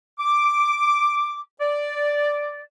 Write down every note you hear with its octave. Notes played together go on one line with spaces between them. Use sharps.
D6
D5